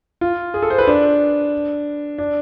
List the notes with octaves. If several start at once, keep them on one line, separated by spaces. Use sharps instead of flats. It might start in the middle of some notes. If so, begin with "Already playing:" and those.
F4
G#4
A4
C5
B4
D4
D4